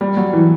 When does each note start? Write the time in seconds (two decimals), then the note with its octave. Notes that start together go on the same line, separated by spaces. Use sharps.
0.01 G3
0.17 F#3
0.33 E3